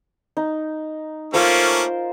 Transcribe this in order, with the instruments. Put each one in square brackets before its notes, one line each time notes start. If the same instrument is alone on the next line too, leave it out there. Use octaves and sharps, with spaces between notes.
[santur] D#4
[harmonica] A3 A#3 C#4 [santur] F4 A#4 C5